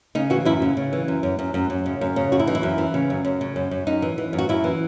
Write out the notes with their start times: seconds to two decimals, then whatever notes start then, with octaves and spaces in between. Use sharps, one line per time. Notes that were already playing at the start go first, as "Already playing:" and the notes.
0.15 C#3 D#4
0.30 E3 F#4
0.45 F#2 E4
0.62 C#3
0.77 C#3
0.93 E3
1.08 F#2
1.23 F#2
1.39 F#2
1.54 F#2
1.70 F#2
1.86 C#3
2.01 F#2
2.16 C#3
2.32 F#2 F#4
2.39 E4
2.47 E3 D#4
2.55 E4
2.63 F#2
2.78 E3
2.94 C#3
3.10 F#2
3.25 F#2
3.41 C#3
3.56 F#2
3.71 F#2
3.87 F#2 D#4
4.02 E3
4.18 E3
4.33 F#2
4.38 F#4
4.49 F#2 E4
4.64 E3